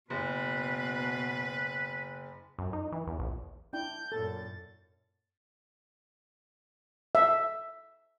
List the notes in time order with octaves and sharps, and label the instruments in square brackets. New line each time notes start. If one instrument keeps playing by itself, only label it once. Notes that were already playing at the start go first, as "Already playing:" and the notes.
[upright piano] F#1 [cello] B2 [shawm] B4
[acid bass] F#2
D#4
E3
E2
A#1
[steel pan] D4 E4 G5 [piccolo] G6
[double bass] F#2 A#2 [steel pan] A4 [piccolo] A6
[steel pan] E5